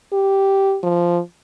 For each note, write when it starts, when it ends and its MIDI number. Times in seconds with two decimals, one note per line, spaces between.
0.13 0.78 67
0.83 1.19 53